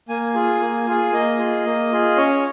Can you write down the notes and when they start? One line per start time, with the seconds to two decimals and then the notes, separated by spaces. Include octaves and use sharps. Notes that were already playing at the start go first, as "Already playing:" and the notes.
0.09 A#3 G#5
0.35 F4 G#4
0.60 A#3
0.87 F4 G#4
1.12 A#3 D#5
1.39 F4 G#4
1.66 A#3
1.92 F4 G#4
2.17 C#4 C#5